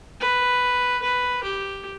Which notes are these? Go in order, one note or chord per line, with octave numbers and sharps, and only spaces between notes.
B4
B4
G4